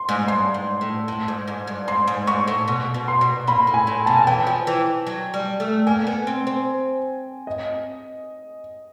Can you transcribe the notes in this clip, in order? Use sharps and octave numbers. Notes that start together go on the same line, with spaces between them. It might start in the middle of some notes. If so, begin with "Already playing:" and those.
Already playing: C6
G#2
G2 C6
G#2
A2
A2
G#2
G#2
G2
G#2 C6
G#2
G#2 C#6
A2
B2
B2
C6
B2
A#2 B5
A2
G#5
A2
B2 A5
G#5
E3 G5
F3
E3
F#3
G3
A3
A#3 G#5
B3
C4
C4
D#5